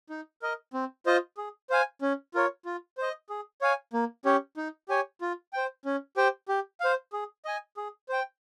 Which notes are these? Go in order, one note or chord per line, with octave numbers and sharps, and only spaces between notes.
D#4
A#4 D#5
C4
F4 C5 D#5
G#4
C5 F5 G#5
C#4
F4 A#4 C#5
F4
C5 D#5
G#4
C#5 F5 G#5
A#3
C#4 G4 C#5
D#4
G4 C#5 G#5
F4
C5 G5
C#4
G4 C5 G5
G4
C5 F5
G#4
D#5 G#5
G#4
C5 G5